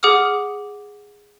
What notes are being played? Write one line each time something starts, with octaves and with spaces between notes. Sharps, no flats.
G#4 F#5 D6 D#6 F6